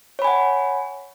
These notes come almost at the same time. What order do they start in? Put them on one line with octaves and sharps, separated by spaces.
C#5 B5 G#5 F#5